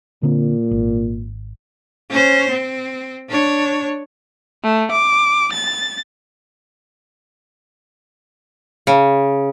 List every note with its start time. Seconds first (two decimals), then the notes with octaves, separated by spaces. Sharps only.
0.23 A#2 D3 C4
0.71 G#1
2.10 C#4 C5
2.50 C4
3.29 D4 C#5
4.63 A3
4.91 D6
5.52 A6
8.87 C#3